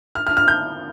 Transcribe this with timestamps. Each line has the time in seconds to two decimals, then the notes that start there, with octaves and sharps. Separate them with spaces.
0.15 F6
0.27 F6
0.37 F6
0.48 G6